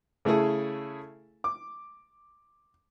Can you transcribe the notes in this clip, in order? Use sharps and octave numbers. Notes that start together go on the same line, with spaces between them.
C#3 A3 E4 G#4 A4
D6